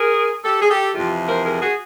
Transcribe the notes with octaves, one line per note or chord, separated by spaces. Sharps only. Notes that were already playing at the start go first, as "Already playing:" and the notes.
Already playing: G#4 A#4
G4 A4
G#4
G4 A4
F2 C3 E3 F4 G4
A#4 C5
G#4 A#4
F#4 G#4